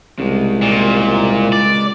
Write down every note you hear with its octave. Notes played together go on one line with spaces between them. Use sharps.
C2 C#3 G#3
A#2
D5